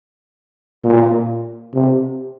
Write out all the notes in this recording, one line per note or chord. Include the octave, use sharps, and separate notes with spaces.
A#2
C3